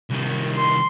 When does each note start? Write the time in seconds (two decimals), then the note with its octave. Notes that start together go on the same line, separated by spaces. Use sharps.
0.10 C2 D#3
0.58 C6